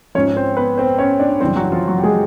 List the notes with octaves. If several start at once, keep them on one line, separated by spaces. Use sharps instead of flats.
G#2 F3 C#4 C#5
C4 C5
B3 B4
C4 C5
C#4 C#5
D4 D5
F#2 C#3 E3 G3 C4 C5
F#3 F#4
F3 F4
F#3 F#4
G4
G#3 G#4